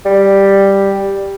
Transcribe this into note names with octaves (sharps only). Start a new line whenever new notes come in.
G3